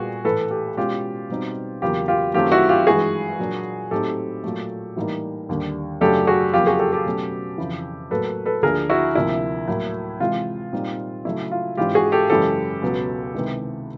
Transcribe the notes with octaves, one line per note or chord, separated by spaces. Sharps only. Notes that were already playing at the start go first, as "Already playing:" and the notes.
Already playing: A#2 G3 B3 F#4 G#4
A2 E3 A3 A4 B4
G4 A4
B2 G#3 C#4 F4 G4
B2 G3 C4 D#4
E2 C#3 F#3 A#3 F4 G4
F4 G4
F#2 D#3 F#3 A3 C4 F4 G4
E4 F#4
F4 G4
G2 E3 G#3 F#4 G#4
A#2 F#3 A#3 D4
A2 F#3 A3 C4 D#4 G4 A4
A#2 F#3 A3
A2 E3 G3 A#3 D#4
D#2 D3 G3
F#2 C#3 F#3 A3 D4 G4 A4
F#4 G#4
F2 C#3 F#3 A#3 F4 G4
F#4 G#4
G4 A4
G4 A4
B2 F#3 A3 C#4
F2 C#3 E3
A2 F#3 A#3 A4 B4
A4 B4
D2 D3 F3 A#3 D4 G#4 A#4
E4 F#4
D2 C3 F3 A#3 E4
A2 F#3 A#3
C3 E3 G#3 F4
A#2 G3 C4 D#4
C#3 F#3 A3 E4
F4
G#2 E3 G#3 C#4 E4 F4 G4
F#4 G#4
G4 A4
F#2 C#3 E3 G#3 C#4 G4 A4
C#2 B2 F#3 B3
C3 D#3 G#3 B3 E4